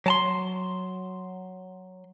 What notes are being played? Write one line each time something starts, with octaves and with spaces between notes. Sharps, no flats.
F#3 A5 C6